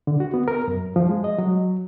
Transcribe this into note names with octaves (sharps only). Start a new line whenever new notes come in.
D3
F#4
B3
A#4
F#2
F3
G#3
D#5
F#3